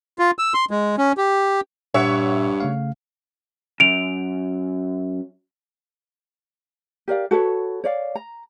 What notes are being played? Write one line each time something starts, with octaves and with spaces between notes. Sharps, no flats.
F4
E6
C6
G#3
C#4
G4
G2 A#2 C#5 E5 F#5 E6
C#3 A3 F5
F#2 D7 F7
G4 A#4 D5 F5
F#4 A4 B4 C#5
C#5 D5 F5
A#5